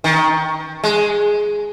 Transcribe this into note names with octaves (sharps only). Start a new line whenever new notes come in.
D#3
G#3